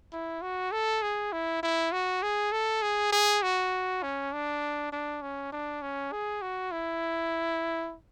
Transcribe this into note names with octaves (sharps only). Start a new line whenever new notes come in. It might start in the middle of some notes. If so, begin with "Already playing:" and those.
E4
F#4
A4
G#4
E4
E4
F#4
G#4
A4
G#4
G#4
F#4
C#4
D4
D4
C#4
D4
C#4
G#4
F#4
E4